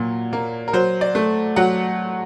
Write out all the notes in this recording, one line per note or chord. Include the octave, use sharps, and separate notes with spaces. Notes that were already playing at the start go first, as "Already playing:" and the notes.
Already playing: A#2 F#3
A#3
A#4
F#3 C5
D5
A3
F#3 F#5